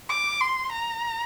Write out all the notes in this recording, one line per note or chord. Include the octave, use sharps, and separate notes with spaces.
D6
C6
A#5